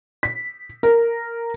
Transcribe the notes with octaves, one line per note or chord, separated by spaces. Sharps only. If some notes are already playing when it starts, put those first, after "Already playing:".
B6
A#4